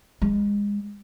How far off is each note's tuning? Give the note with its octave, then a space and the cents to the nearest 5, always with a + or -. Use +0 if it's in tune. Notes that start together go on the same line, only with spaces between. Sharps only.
G#3 -25